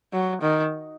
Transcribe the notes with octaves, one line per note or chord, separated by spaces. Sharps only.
F#3
D#3